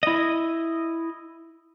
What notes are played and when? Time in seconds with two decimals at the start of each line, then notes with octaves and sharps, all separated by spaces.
0.03 E4 D#5